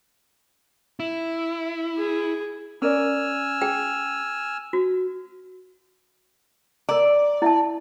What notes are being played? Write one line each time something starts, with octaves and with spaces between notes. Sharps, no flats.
E4
G#4
C#4 A#4 D5 G#5 E6 F6
G#4 G5
F#4
A#4 D5 A#5
E4 E5 A5